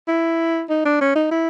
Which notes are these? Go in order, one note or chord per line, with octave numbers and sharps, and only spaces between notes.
E4
D#4
D4
C#4
D#4
E4